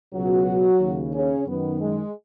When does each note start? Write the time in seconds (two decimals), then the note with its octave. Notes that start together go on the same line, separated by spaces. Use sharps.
0.13 C#2 B2 F#3 F#4
0.80 D#2 C#3
1.13 C#3 C#4
1.47 F#2 D#3 B3
1.81 G#3